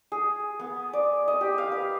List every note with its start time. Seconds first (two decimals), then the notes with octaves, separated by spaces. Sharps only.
0.12 G#4
0.60 B3
0.93 D5
1.28 D#5
1.41 G4
1.58 F5
1.72 B4